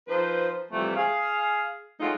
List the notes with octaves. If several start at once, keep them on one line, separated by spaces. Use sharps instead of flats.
F3 D#4 B4 C5
C3 E3 F3 G3 A3
G#4 F5
F#3 G#3 A3 D#4 F4